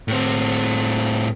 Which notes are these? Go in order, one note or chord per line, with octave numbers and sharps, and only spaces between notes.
A2 C4